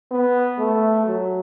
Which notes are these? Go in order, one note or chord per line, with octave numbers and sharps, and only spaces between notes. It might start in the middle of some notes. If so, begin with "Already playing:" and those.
B3
A3
F#3